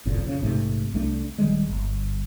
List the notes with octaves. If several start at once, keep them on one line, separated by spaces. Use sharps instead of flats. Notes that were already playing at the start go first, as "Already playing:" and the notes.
F#1 C2 F2 A#2
F2 C#3
A#1 G#2 C3 A3
C2 A3 D4
D#1 D#3 G3 G#3
G1